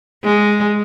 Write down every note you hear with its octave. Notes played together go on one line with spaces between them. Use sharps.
G#3